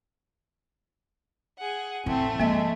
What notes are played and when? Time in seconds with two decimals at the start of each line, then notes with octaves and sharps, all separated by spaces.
1.59 G#4 F#5
2.06 A1 E3 A3 C4
2.40 G#2 F3 G#3 A#3 E5